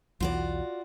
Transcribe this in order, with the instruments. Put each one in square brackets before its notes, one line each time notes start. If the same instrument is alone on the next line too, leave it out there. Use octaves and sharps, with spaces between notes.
[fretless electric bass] B1 E2 E3 [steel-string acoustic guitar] F4 F#4 D5